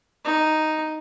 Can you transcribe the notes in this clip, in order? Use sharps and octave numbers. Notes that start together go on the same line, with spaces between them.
D#4